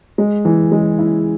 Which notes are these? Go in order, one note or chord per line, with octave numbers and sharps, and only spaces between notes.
G#3
E3
G#3
E4